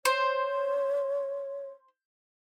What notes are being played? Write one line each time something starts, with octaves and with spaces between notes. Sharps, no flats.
C5 C#5